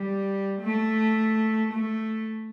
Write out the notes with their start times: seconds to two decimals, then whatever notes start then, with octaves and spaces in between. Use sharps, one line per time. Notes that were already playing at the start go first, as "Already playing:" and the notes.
Already playing: G3
0.62 A3
1.73 A3